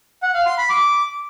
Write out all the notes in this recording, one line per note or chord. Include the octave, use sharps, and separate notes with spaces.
F#5
F5
C6
B5
D6